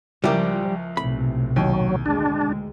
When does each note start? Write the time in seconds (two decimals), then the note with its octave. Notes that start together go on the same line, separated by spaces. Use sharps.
0.24 C#2 F3 G3 E4 G4 A#4
0.97 B1 A2 C3 B5
1.56 D#2 F#3
2.06 D2 G#3 D4